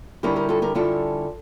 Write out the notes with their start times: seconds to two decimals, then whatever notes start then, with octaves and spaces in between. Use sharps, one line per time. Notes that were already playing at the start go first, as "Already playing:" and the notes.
0.23 D3 G3 C#4 E4 G4 A#4
0.36 G4 A#4
0.49 F4 A4
0.62 G4 A#4
0.75 D3 G3 C#4 E4 F4 A4